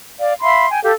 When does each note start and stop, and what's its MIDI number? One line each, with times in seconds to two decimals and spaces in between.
0.19 0.34 74
0.19 0.34 77
0.42 0.68 76
0.42 0.68 77
0.42 0.68 83
0.42 0.68 84
0.70 0.82 79
0.70 0.82 80
0.83 0.92 67
0.83 0.92 69
0.83 0.92 77